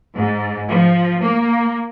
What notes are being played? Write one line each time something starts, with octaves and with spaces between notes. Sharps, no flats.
G#2
F3
A#3